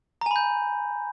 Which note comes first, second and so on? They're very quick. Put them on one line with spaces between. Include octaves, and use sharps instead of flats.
A#5 G#5 B5 G6